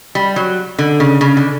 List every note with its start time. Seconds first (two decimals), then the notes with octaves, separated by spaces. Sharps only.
0.15 G3
0.36 F#3
0.79 D3
1.00 C#3
1.21 C#3
1.37 D3